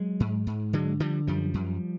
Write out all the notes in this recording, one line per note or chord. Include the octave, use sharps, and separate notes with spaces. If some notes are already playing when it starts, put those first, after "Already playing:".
Already playing: F#3 G#3
G#2
G#2
D3 F#3 G#3
D3 F3 G3
F#2 F3 G3
F#2